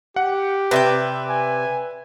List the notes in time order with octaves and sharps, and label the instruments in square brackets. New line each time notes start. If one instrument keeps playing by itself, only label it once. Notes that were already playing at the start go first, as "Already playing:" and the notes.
[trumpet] G4 [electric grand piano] F#5
[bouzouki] C3 D5 G5 [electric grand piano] B4 E5
[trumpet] G#5